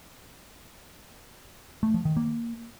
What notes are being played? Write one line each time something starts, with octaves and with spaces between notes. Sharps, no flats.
A3
F3
D#3
A#3